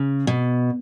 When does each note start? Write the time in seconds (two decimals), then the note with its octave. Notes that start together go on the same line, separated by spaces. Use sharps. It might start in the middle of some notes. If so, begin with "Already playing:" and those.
Already playing: C#3
0.27 B2